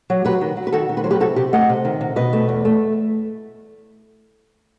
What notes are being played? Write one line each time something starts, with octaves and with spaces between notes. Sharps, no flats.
F#3
F#3 G4 B4
D#3
F#3
B4
D#3 F#4 A4
D#3
B4
F#3 C5
G4 B4
C3 F#4 A4
C3 G4
A3 D#5 F#5
C3
D#3
C3
B2 B4 D#5
A3
E2
A3